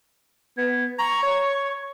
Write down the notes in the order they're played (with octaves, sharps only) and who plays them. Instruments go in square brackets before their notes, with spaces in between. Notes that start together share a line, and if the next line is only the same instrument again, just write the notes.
[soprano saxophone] B3 [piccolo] G#6
[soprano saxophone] A#5 [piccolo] C#6
[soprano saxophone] C#5